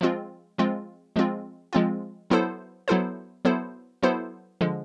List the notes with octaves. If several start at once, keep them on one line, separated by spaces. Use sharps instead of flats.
F3 G#3 C4 F4
F3 G#3 C4 F4
F3 G#3 C4 F4
F3 G#3 C4 F4
F#3 B3 E4 A4 C5
F#3 B3 E4 A4 C5
F#3 B3 E4 A4 C5
F#3 B3 E4 A4 C5
D3 F3 G#3